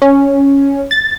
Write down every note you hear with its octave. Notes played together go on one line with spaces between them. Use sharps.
C#4
A6